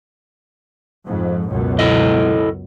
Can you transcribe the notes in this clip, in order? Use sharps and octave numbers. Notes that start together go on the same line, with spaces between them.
F2 G#2
C#2 F#2 B2
E4 A4 D#5